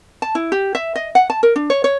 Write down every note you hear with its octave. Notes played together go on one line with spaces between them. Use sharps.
A5
E4
G4
E5
D#5
F#5
A5
A#4
D4
C#5
C#5